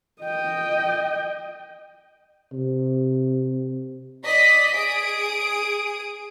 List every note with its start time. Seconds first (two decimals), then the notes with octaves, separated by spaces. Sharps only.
0.21 D#5 G5
2.53 C3
4.24 D5 D#5 B6
4.74 G#4 D#6 D7